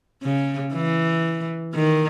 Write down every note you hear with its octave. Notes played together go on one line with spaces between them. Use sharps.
C#3
E3
D#3